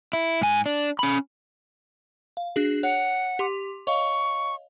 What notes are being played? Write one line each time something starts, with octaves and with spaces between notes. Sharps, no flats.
E4
G#2 G#5
D4
C#4 B5
F5
D4 F#4 G#4
C#5 F#5 F#6
G4 C6 D6
C#5 D#5 F5 C#6